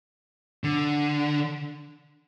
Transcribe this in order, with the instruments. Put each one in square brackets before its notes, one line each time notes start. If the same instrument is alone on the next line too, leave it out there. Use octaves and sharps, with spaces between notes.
[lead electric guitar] D3